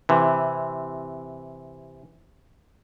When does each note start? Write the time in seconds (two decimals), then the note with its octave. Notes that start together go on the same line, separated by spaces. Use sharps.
0.09 C3 E3